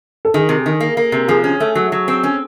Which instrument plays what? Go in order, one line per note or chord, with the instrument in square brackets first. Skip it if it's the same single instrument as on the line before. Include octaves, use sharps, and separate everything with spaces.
[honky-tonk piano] A4
[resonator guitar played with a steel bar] D#3 [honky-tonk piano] G#4
[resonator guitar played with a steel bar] C3
D#3
A#3
A#3
C3
[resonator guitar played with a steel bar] F3 [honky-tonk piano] G#4
[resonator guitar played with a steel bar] C#4
A3
F#3
F#3
C4
C#4